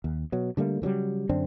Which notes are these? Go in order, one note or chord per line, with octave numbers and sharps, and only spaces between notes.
D#2
B2 F#3
D3 G3 A3 A#3
C#3 E3 F#3 G3
F#2 D3 C4 D4